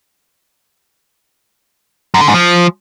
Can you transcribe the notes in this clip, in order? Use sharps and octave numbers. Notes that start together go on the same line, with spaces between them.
F#2
D3
G#2
F3